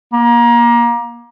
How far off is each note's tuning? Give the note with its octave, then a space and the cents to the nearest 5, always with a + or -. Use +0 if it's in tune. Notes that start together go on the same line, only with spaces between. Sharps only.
A#3 +25